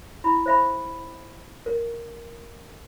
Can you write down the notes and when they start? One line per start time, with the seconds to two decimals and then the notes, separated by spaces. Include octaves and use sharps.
0.24 E4 B5
0.46 C5 E5 B5
1.66 A#4